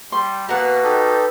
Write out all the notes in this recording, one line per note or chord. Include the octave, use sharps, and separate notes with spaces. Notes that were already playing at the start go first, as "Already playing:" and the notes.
G3 C6
B2 A#3 A#4 F#5
D#4 G4 A4